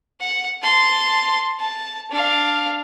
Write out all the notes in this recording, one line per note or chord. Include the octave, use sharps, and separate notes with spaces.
F#5
A5 C6
A5
D4 F5